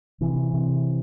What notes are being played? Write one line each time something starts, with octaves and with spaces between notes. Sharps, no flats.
C3 E3
C3